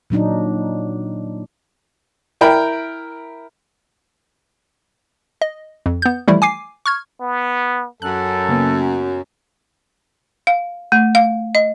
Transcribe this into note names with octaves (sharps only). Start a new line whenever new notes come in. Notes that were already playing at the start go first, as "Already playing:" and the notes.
A#2 F#3 D4 D#4
E4 A#4 G5 B5
D#5
F2
B3 G6
E3 F3 G3 A3 E4
G#5 D6 C7
C#6 F6 G#6
B3
F#2 A4 F#6
C#3 A#3 B3
F5
A3
F5
D#5